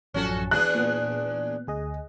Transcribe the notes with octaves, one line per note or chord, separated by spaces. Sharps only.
A1 F#2 F3 C#4 F#4 A4
E2 D4 G#4 F#6
A#2 B3
D2 G#4 D#5